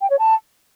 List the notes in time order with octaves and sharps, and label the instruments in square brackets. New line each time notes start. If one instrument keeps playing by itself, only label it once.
[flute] G5
C#5
A5